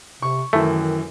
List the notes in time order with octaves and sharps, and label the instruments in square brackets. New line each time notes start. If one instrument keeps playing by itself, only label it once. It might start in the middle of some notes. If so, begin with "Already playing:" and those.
[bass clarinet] C3 [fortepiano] C#6
[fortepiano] F#2 E3 [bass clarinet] D#3 [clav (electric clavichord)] A3